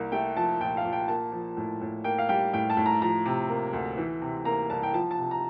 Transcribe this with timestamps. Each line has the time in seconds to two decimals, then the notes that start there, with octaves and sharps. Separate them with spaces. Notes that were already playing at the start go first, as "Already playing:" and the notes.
Already playing: C2 A#3
0.12 A3 G5
0.37 F3 A5
0.60 A#2 G5
0.77 F5
0.85 A#2
0.92 G5
1.08 A#3 A5
1.32 F3
1.57 A2
1.81 A2
2.04 A#3 G5
2.18 F5
2.29 G3 G5
2.53 A2 G5
2.70 A5
2.77 A2
2.86 A#5
3.02 F3 A#5
3.26 C3
3.49 A#3
3.73 D2
3.97 E3
4.21 C3
4.45 A#3 A#5
4.70 C2 A5
4.83 G5
4.94 F3 A5
5.11 A5
5.18 C3
5.31 A#5